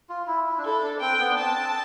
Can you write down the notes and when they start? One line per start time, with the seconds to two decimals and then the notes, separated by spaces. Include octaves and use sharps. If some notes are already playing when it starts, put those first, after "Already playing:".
0.09 F4
0.27 E4
0.46 E4
0.58 D4
0.65 E4 A4
0.83 D4
1.01 C4 G5
1.20 B3
1.30 D4
1.37 C4 A5